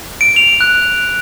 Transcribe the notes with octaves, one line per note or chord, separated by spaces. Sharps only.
D7
F7
F#6